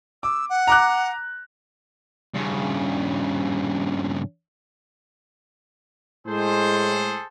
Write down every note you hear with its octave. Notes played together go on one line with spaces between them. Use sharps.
D6 E6
F#5
A#5 D6 F#6
G2 C#3
A2 G#3 G#4 A4 C5